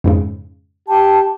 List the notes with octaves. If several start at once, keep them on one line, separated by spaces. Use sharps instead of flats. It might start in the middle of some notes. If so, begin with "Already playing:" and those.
F2 G#2 C#3
G4 A5